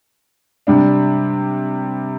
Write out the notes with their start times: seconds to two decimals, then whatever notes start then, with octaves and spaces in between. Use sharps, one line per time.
0.67 C3 G3 D4